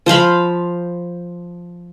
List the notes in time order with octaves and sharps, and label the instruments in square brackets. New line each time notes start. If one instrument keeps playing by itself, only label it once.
[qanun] F3 C5 F5 B5